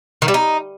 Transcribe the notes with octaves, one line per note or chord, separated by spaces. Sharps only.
D#3
G3
D#4